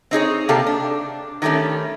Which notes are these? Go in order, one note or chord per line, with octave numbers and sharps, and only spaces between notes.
C4 D#4 G#4 C#5
C3 A#3 G4 A4 F5
D4
D#3 F#3 G3 A3 C#4